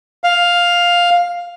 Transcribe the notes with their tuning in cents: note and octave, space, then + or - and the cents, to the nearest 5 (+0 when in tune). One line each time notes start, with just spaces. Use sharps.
F5 +5